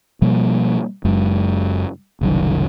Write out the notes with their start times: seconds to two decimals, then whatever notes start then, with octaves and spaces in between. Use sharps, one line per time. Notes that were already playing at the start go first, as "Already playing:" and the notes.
0.22 B2 F3 G3 A#3
1.05 F#1 F#2 G#3
2.21 F#1 C2 F#2 D#3